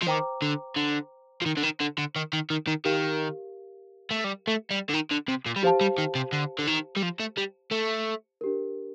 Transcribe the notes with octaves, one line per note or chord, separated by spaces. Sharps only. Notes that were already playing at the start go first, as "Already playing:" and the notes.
F3
D#3 C5 G5 A#5 D6
D3
D3
F3
D#3
D3
D#3
D3
D3
D#3
D#3
D#3
D#3
D#3 G4 A#4 F5
A3
G3
A3
G3
D3
D#3
D3
C3
A#2
G3
F3 G4 C5 F5 A5
G3
D#3
C3
D3
D3
D#3
G3
F3
A3
G3
A3
D4 G4 A#4